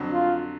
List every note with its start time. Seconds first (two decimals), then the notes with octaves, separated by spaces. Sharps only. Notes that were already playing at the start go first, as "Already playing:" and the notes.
Already playing: F2 D3 F#3
0.13 F4